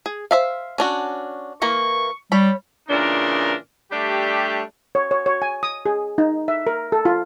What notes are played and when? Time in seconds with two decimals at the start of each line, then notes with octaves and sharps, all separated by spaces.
0.06 G#4
0.31 C5 E5 F5
0.78 C#4 D4 F#4
1.62 E3 A#3 A#4 C#6
2.32 G3 C#5 B5
2.88 A#2 C#3 E3 D4 D#4 A#4
3.91 G3 A3 D4 G4
4.95 C#5
5.11 C#5
5.26 C#5
5.42 G#5
5.63 D#6
5.86 G#4
6.18 D#4
6.48 E5
6.67 A#4
6.92 A4
7.05 F4